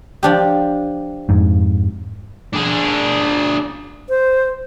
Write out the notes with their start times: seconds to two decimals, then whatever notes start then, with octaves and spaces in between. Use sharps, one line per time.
0.23 F3 D4 G4
1.29 F2 G#2
2.53 D4 G#4
4.09 C5